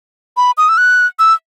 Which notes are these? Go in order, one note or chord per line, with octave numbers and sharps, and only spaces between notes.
B5
D#6
E6
F#6
E6